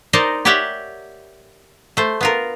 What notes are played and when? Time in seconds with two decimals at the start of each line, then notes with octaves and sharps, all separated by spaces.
0.13 D#4 A#4 C5 D5 D#5
0.45 G4 C#5 D5 E5 F#5 G5
1.97 A3 C5
2.21 B3 F4 A#4